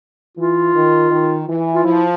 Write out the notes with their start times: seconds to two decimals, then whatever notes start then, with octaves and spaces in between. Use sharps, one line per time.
0.37 E3 F4
0.75 D#3
1.11 D#3
1.49 E3
1.75 F4
1.85 F3 E4